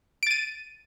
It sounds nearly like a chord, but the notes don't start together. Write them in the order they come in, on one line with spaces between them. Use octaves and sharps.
D7 A6 D#7